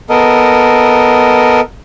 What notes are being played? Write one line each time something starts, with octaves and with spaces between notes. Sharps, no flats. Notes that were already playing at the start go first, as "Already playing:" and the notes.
B3 A4 A#4 D#5